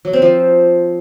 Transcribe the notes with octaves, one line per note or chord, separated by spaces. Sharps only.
F#3
C4
F3